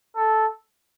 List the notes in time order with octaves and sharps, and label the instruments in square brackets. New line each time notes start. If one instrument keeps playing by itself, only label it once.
[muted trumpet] A4